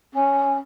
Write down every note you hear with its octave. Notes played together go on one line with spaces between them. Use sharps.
C#4